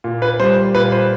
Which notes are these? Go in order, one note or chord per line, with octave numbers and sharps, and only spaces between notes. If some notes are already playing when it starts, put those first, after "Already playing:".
A#2
B4
G3 C5
A#2 B4
C5